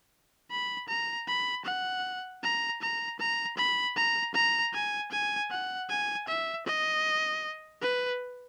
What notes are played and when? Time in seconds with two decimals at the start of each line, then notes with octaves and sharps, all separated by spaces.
0.51 B5
0.88 A#5
1.28 B5
1.65 F#5
2.43 A#5
2.82 A#5
3.19 A#5
3.57 B5
3.97 A#5
4.34 A#5
4.73 G#5
5.11 G#5
5.50 F#5
5.89 G#5
6.28 E5
6.66 D#5
7.81 B4